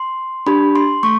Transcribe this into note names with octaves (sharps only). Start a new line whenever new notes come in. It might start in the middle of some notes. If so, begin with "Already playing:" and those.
Already playing: C6
D4 G4 B5
C6
A3 C#6